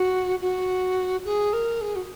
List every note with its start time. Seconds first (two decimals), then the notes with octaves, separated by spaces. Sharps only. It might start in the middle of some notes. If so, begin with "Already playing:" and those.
Already playing: F#4
0.41 F#4
1.25 G#4
1.53 A#4
1.81 G#4
1.95 F#4